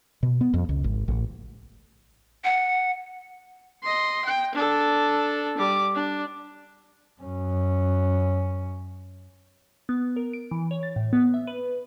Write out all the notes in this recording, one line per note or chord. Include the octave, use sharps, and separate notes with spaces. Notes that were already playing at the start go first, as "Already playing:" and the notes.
B2
B3
F2
C#2
G#1
A1
F#5
D#5 C6
G5
D4 A4
G3 D6
D4
F#2 C#4
B3
A#4
D7
E3
C#5
A6
A2
B3
E5
B4